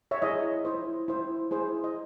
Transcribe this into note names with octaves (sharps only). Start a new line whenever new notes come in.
C#5 E5
E4 G#4 C#5 D#5
E4 C5
E4 C5
E4 G#4 C5
D#5